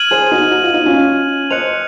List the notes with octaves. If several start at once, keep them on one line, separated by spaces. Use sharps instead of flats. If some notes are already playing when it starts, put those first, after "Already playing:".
Already playing: F6 G#6 D#7 F#7
G#4 C5
D#4 F#4
F#4
F4
D#4
C#4 F4
C5 D#5 F#6 C#7 F7